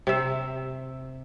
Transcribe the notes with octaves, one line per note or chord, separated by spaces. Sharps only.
C3 E5